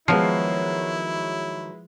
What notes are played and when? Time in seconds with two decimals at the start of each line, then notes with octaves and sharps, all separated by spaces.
0.08 D#3 F3 F#3 G#3 B3 E4 C7